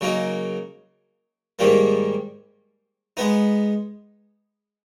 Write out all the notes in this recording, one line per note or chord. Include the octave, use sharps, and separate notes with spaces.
C#3 F#3 A#3 D#4
G#2 D#3 G3 A#3
G#3 B3 D#4